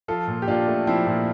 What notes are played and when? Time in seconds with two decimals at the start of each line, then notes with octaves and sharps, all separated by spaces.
0.08 F3 F4 A4
0.27 A#2
0.42 G4
0.47 A#2 D4 F4
0.68 A3
0.87 F3 C4 E4
1.06 A#2